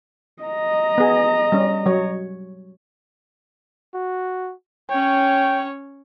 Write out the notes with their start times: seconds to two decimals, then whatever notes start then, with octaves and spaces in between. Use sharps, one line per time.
0.43 D#5 A#5
0.98 B3 G#4
1.52 G3 C#4
1.86 F#3 C#5
3.94 F#4
4.90 C#4 C#5 G5